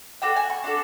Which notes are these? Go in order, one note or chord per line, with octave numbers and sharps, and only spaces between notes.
D4 F#4 A4 G5
G#5
C#6
D4 F#4 A4